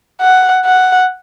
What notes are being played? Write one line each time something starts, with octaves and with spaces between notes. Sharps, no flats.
F#5
F#5